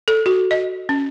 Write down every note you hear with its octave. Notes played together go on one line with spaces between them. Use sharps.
A4
F#4
D#5
C#4